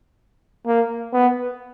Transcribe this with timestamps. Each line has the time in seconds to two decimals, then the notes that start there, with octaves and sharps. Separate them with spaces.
0.67 A#3
1.13 B3